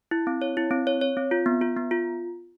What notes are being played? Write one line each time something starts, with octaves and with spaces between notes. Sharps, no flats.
E4
C4
C#5
E4
C4
C#5
C#5
C4
F4
B3
F4
B3
F4